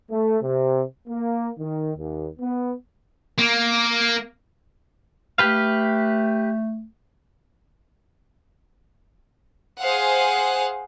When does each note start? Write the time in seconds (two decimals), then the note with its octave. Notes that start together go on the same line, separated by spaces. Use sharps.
0.11 A3
0.43 C3
1.08 A#3
1.59 D#3
1.96 D#2
2.39 B3
3.38 A#3
5.38 A3 G4 B4 F5
9.79 G#4 C5 F5 F#5